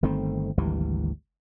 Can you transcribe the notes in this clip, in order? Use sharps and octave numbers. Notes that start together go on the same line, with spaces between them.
G1 D#3 A3 C4
G#1 D2 E3 G3